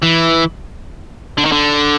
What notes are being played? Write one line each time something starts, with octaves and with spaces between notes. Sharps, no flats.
E3
D3
D#3
D3